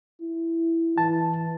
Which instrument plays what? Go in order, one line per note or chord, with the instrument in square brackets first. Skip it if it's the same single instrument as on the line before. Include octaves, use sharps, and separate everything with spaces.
[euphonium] E4
[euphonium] E3 [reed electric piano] A5